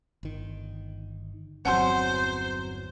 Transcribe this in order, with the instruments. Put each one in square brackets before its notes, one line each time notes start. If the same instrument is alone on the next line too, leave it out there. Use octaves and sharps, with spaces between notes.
[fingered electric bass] G1 D#3
[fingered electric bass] G1 E2 [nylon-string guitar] F#3 C4 C#4 [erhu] C5 [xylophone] F#5 C6